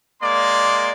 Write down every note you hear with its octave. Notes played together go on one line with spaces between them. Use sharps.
G#3 A#3 D5 C6